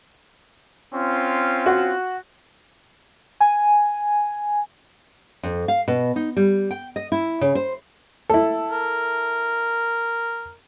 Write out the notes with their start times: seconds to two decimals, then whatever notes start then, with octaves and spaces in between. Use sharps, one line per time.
0.95 C4 C#4 F4
1.66 F#4
3.41 G#5
5.43 F2
5.68 F5
5.88 B2
6.16 D#4
6.37 G3
6.71 G5
6.96 D#5
7.12 E4
7.41 C#3
7.55 C5
8.30 E4 A4
8.72 A#4